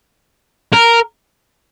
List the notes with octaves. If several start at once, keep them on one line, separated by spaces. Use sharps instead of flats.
A#4